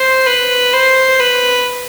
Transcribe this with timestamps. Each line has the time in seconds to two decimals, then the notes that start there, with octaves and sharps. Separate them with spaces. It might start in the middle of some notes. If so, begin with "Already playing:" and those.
Already playing: C5
0.26 B4
0.73 C5
1.19 B4